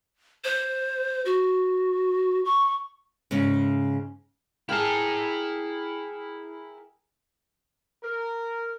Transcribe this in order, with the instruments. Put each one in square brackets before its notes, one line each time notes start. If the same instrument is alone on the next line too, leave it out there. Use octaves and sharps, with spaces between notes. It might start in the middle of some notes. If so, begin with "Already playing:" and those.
[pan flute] C5
F#4
C#6
[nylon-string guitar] G#2 C#3 C#4
[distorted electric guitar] E4 A5 [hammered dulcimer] G#4 A#4 G5
[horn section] A#4